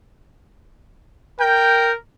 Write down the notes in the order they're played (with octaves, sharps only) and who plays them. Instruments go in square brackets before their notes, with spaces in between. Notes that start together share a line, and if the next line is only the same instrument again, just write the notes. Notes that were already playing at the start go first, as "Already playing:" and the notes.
[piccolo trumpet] A#4 [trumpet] G5 [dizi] G6